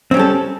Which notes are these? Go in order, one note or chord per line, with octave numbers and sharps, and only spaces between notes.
G3 C4 C#4 A4